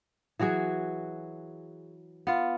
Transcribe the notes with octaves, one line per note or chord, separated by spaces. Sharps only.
E3 F#3 F#4 G#4
B3 F4